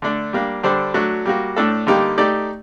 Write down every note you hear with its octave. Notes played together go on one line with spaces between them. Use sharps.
D3 A3 D4
G3 A#3 D4
D3 G3 D4 A4 C5
F#3 A3 D4 F#4
G3 A#3 F#4
A2 A3 D4 A4
D3 G3 A#3 D#4 G4
A3 D#4 G4 D5